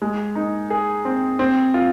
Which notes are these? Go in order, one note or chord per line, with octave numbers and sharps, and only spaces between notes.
G#3
D#4
G#4
C4
C4
F4